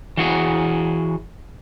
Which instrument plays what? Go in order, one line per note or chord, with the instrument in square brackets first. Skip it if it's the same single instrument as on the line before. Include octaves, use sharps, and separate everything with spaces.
[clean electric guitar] E3 F#4 G#4